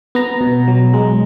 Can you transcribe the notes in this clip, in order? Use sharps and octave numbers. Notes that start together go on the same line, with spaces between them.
B3 A#5
B2
F#3
G#3